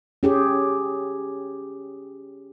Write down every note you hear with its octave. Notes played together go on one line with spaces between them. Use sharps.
C#4 G4 G#4